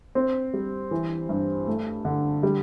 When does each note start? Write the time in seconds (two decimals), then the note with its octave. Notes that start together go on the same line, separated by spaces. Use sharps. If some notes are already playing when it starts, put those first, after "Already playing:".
0.15 C4
0.53 G3
0.91 E3
1.29 G2
1.67 A3
2.05 D3
2.43 G3